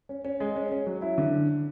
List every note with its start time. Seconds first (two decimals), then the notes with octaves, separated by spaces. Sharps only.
0.09 C#4
0.24 C#4
0.40 G#3
0.56 C#4
0.72 C#4
0.86 F#3
1.02 E4
1.18 D3